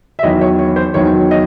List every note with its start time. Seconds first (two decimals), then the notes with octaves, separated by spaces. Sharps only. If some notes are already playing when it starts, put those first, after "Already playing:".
0.19 E5
0.23 E2 D#3 F#3 D#5
0.41 C#5
0.59 C#5
0.76 C5
0.94 E2 D#3 F#3 C#5
1.31 D#5